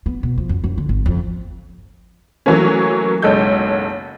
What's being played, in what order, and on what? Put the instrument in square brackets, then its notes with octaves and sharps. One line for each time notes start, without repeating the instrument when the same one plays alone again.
[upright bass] B3
B2
F3
F#2
F#2
D3
G#1
F2
[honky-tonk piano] E3 F#3 A3 A#3 C#4
F#1 B1 G#3 A4 G6